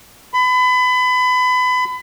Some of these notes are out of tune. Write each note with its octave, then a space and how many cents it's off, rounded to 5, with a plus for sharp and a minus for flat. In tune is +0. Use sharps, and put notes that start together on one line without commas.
B5 +30